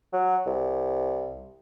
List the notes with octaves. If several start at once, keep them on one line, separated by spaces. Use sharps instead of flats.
F#3
C2